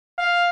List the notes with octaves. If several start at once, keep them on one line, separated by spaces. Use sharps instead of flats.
F5